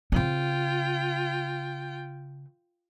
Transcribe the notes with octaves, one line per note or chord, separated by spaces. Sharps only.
C#3 C4 F4 G5